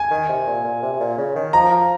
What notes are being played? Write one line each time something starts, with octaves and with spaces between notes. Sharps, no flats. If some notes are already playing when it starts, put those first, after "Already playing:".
Already playing: G#5
D#3
C3
A#2
A#2
C3
C3
A#2
C#3
D#3
F3 A#5
F3